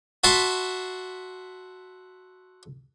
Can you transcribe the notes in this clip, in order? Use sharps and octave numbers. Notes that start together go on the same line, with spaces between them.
F#4 E5 A5 B5 C6